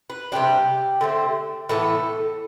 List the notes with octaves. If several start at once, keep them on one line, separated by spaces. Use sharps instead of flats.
B4
C3 G3 B3 D4 G4
D3 A3 C4
A2 E3 B3 A4